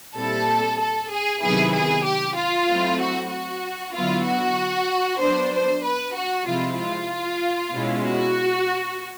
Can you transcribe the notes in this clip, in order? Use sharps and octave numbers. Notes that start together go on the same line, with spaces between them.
A#2 G3 C4 E4 A4
A4
G#4
C3 D#3 F#3 B3 E4 G#4
G#4
G4
F4
F#3 A3 C4 E4
F#4
F#4
D3 F#3 B3 E4 F4
F#4
F#3 B3 D4 C5
C5
B4
F#4
C3 F3 G#3 C4 E4 F4
F4
B2 G#3 C#4 E4
F#4